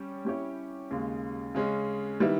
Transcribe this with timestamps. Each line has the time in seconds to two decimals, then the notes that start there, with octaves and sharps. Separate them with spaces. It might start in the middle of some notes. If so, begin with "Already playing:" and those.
Already playing: G3 C#4 G4 C#5
0.25 G3 C#4 E4 G4 C#5
0.91 D#2 C#3 G#3
1.55 C#3 G#3 C#4
2.20 D#3 G3 B3 E4